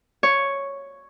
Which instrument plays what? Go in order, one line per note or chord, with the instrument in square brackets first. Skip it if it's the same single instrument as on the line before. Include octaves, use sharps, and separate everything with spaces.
[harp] C#5